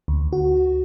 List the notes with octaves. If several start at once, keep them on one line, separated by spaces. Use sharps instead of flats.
D2
F#4